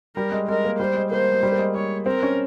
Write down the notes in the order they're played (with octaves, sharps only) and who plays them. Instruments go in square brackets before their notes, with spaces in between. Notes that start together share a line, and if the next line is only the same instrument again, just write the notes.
[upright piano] G3 [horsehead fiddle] A#4
[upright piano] G#3
[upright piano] G#3 [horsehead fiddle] A#4
[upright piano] A#3
[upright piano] G3 [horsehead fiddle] C5
[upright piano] G#3
[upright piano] A#3 [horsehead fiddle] C5
[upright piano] G#3
G3
A#3
G#3
[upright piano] G#3 [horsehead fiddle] C#5
[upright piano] C4 [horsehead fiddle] A#4
[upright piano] C#4